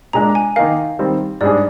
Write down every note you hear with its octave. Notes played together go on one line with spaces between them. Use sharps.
A#2 G#3 D4 A#5
G#5
D#3 A#3 D#4 A#4 F5
D#3 G3 C4
G#2 G3 D4 G#4 D5